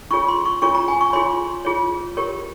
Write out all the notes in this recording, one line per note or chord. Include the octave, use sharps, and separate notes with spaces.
C#4 F4 G#4 C#5 C#6
C6
C#6
C#4 F4 G#4 C#5 C#6
A#5
G#5
C#6
F4 G#4 C#5 C6
F4 G#4 C#5
G4 A#4 C#5